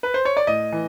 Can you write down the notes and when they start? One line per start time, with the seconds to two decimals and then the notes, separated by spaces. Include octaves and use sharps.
0.03 B4
0.14 C5
0.25 C#5
0.37 D5
0.47 A2 D#5
0.72 E3